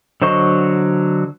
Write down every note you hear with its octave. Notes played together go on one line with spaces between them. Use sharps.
D3 F#3 C5 D#5 C#6